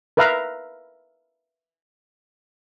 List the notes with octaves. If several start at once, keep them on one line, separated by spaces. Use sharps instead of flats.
A#4 B4 E5 F5 A#5